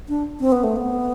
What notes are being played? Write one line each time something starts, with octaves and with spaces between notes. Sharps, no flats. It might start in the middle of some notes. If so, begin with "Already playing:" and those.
D4
C4
B3
A3
B3